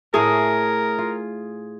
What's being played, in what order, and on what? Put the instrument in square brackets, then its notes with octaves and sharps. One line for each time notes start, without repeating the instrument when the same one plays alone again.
[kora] A2 A3 C#5 [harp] G#4 [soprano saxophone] A#4
[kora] F4